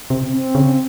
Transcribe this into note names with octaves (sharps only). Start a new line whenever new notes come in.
C3 C4
C4
C#3